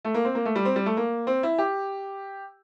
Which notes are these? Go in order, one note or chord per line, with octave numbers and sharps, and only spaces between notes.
A3
A#3
C4
A#3
A3
G3
C4
G3
A3
A#3
C4
E4
G4